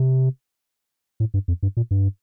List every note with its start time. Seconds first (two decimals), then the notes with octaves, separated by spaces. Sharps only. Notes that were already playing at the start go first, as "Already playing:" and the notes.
Already playing: C3
1.20 A2
1.34 G2
1.48 F2
1.63 G2
1.77 A#2
1.91 G2